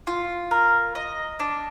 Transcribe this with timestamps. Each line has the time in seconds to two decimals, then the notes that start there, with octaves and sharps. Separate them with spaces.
0.07 F4
0.51 A#4
0.95 D#5
1.40 D4